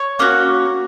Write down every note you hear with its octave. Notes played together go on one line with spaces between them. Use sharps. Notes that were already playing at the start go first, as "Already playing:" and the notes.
Already playing: C#5
A#3 C#4 F#4